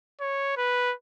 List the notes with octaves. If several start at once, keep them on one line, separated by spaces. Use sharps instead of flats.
C#5
B4